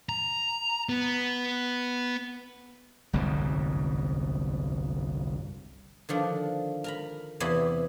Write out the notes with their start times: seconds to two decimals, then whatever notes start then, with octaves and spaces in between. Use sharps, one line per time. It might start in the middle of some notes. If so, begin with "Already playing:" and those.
0.09 A#5
0.89 B3
3.13 G1 C2 F2 G#2
6.09 D3 D#3 F3 D4
6.84 A#4 A#5 B5
7.40 E2 C3 E3 E4 D#5 B5